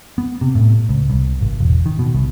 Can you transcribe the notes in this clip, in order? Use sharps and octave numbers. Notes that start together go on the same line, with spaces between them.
B3
C3
A2
C#2
C2
G#1
E1
D#3
B2
C2